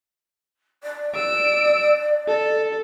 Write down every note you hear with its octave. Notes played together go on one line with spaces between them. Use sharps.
D5
E6 D7
A4